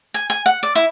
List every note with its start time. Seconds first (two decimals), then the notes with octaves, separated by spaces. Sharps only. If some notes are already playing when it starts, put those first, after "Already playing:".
0.14 G#5
0.30 G#5
0.46 F#5
0.63 D5
0.75 E4